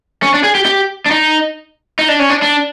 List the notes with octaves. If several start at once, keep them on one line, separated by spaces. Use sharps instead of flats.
C#4
D4
G#4
G4
G4
D4
D#4
D#4
D4
C#4
D4
D4